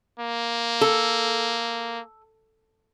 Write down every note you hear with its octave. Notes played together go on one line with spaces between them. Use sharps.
A#3
A4